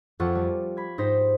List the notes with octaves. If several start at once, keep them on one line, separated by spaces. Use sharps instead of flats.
F2 F4 A4 F#5 C#6 D6
G3
B5 G#6
G#2 D#4 G4 C5 A#6 B6